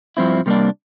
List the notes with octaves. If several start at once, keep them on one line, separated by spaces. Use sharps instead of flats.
G2 F3 C4 E4
C3 G3 A#3 D4